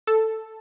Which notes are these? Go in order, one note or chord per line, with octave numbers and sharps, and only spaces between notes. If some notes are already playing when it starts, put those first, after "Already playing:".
A4